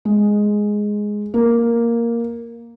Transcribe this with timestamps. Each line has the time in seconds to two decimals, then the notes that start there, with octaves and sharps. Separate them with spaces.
0.05 G#3
1.34 A#3